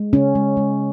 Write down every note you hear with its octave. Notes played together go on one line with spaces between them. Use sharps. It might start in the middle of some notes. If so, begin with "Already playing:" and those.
Already playing: G#3
C#3 C#4
G#3
G#3